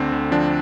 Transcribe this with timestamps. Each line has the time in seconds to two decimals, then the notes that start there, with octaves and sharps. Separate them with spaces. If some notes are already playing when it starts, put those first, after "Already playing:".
Already playing: D2 D3 C4
0.12 D2
0.31 F3 D4